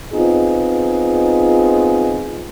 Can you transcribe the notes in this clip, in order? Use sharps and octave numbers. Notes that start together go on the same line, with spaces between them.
B3 C4 D#4 F4 G#4